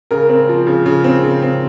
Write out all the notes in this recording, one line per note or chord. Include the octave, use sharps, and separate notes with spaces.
C#3 A#4
C4
F3
C#3
C#3
C4
C#3
C4